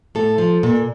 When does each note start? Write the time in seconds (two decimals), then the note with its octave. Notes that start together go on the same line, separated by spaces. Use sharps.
0.15 A2 A4
0.38 F3
0.63 A#2